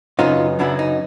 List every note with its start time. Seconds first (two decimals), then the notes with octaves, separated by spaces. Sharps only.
0.19 F#2 C#3 F#3 B3 D#4 F4
0.59 F#2 C#3 F#3 B3 D4 E4
0.79 D#4